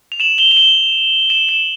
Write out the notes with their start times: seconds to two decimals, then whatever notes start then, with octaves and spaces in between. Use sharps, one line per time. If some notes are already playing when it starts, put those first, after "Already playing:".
0.12 F7
0.20 E7 F#7
0.38 F7 G7
0.51 G7
0.57 E7 F#7
1.30 E7 F#7
1.49 E7 F#7